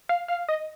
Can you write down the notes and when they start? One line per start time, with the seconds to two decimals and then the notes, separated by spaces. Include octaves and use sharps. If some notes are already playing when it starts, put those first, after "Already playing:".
0.09 F5
0.28 F5
0.49 D#5